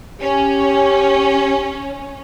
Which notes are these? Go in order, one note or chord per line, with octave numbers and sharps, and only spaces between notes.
C#4 G4